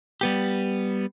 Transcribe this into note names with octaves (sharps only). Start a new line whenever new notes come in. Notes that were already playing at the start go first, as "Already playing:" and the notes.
G3 B3 G4